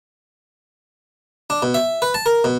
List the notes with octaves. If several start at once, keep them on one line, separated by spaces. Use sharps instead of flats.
D4
B2
E5
B4
A5
A#4
B2